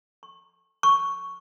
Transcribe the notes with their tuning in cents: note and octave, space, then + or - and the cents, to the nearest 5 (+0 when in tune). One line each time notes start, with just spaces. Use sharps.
C#6 -30
C#6 +5